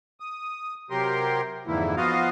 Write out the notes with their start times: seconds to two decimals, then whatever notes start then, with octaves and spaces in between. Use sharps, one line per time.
0.20 D#6
0.90 C3 F#3 G4 A#4 C6
1.67 F2 G#2 D3 E3 A#3 E4
1.97 F3 B3 F4 F#4 D#5 F5